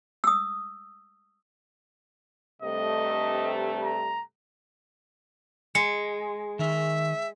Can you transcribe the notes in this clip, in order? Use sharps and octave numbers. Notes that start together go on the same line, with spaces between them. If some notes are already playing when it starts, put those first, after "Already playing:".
D#6 E6
G2 C3 A3 D#5
A#5
G#3 C#7
D#3 A#4 E5